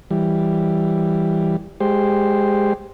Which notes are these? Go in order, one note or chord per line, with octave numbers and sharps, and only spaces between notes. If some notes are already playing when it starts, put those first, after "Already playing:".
E3 G3
G#3 G4 C5